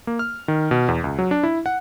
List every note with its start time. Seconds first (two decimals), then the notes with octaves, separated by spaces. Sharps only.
0.07 A#3
0.19 F6
0.48 D#3
0.71 B2
0.88 E2
1.04 C#2
1.19 F#3
1.31 D4
1.43 E4
1.66 F#5